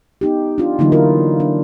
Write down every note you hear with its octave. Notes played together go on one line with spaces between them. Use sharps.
B3 D#4 G4
D4 F4
D3 E3 F#3 A#3 D#4 E4
F4 A#4
D4